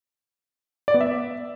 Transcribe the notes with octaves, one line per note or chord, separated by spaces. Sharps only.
D5
B3
E5